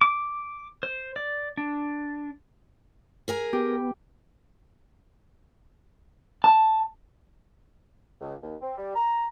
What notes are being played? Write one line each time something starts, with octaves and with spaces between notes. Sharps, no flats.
D6
C5
D5
D4
G#4 A#4 G#5
B3 G4
A5
C#2
D#2
C4
G3
A#5